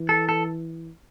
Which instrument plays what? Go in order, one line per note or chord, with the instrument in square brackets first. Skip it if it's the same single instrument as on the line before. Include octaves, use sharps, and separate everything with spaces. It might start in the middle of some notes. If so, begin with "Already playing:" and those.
Already playing: [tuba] E3
[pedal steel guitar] A4
A4